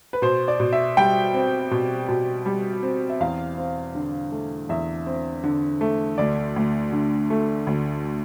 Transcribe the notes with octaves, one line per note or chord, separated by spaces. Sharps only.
B4
B2 C5
D5
B2
E5
G3 G5
C4
B2
B2
G3
C4
E5
E2 F5
C4
D3
A3
E2 E5
C4
D3
A3
D2 D5
D2
D3
A3
D2